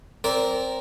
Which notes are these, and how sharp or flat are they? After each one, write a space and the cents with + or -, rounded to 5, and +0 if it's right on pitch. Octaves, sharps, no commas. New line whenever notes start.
C4 +0 A#4 +0 D5 -20